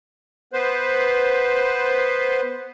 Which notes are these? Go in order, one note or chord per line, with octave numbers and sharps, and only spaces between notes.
B3 B4 C5